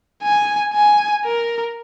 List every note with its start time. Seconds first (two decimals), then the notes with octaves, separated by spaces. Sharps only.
0.23 G#5
0.73 G#5
1.25 A#4